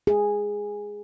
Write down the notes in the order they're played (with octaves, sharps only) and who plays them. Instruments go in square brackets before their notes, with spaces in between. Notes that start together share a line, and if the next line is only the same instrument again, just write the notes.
[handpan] G#4